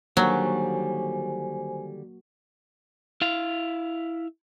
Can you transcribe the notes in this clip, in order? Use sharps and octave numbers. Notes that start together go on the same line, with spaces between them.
D3 D#3 F#3 G3 A#3 F#4 C5 G#5
E4 F5